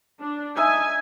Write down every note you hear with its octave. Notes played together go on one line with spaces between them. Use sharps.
D4
D#4 E5 G#5